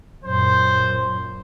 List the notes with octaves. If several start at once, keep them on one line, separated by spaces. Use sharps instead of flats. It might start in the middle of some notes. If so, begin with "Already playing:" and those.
F#2 A#2 C5